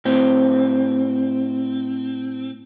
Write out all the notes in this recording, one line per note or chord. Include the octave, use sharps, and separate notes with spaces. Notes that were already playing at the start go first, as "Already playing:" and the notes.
A2 C4